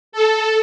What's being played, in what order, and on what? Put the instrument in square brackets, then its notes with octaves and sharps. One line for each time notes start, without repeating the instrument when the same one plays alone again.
[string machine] A4